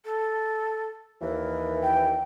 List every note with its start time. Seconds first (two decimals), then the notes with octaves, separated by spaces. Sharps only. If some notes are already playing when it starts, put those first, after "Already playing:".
0.05 A4
1.22 D#2 E3 A#4
1.83 G5